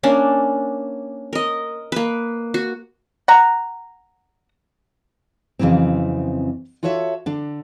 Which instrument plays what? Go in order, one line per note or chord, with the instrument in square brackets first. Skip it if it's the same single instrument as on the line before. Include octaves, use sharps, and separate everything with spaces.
[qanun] A#3 C#4 D4
A#4 D#5
A#3 B4
F#4
[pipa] F#5 A#5
[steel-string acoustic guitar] F2 C#3 E3 F#3 C4
F4 F#4 A4 C#5 D5 E5
D3 D4